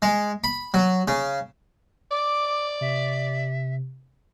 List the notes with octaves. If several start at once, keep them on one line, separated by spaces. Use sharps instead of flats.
G#3
B5
F#3
C#3
D5 D6
C3 E5